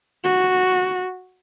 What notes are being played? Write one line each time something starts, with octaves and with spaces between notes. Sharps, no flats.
F#4